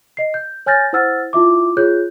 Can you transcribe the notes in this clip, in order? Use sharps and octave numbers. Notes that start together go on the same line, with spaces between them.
D#5 C7
G6
C#5 G#5 F6 G6 A6 A#6
E4 C5 F#5 E6 F6 A6
E4 F4 E5 D6
F4 G#4 C#5 F#6 G6